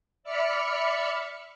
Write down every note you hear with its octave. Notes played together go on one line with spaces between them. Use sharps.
D5 E5 B5 F6 C#7